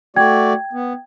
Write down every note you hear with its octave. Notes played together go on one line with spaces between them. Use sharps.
A3 F#4 D5 G5 G#6
B3